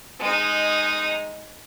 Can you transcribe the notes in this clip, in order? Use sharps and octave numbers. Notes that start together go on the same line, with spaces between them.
G#3 D#4